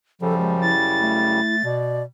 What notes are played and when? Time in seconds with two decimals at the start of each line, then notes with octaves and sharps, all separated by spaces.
0.22 F#2 C#3 F3 G3 A4
0.39 G#3
0.62 E4 A6
1.01 A3
1.64 B2 D5